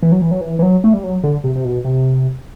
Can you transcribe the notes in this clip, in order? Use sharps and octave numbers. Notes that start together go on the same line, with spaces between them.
E3
F#3
E3
F#3
E3
E3
F#3
A3
G3
F#3
D3
C3
C3
B2
C3